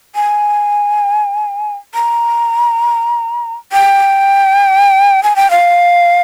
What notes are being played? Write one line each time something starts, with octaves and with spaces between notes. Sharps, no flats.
G#5
A#5
G5
G#5
G5
F5